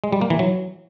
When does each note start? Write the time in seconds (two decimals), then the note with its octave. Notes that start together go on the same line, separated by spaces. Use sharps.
0.04 G#3
0.12 G3
0.21 A#3
0.30 E3
0.39 F#3